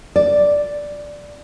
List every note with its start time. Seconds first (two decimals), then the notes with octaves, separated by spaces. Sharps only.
0.16 D5